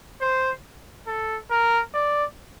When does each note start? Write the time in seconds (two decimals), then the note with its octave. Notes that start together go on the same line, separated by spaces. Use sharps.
0.21 C5
1.07 A4
1.51 A#4
1.94 D5